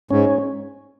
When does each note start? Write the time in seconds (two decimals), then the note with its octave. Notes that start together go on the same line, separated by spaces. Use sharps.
0.11 G#2 C#4